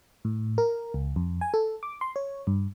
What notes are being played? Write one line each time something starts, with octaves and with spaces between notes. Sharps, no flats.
A2
A#4
C#2
F2
G#5
A4
D6
C6
C#5
G2